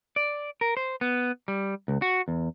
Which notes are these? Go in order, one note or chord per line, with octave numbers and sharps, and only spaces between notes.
D5
A#4
C5
B3
G3
C#2
F#4
E2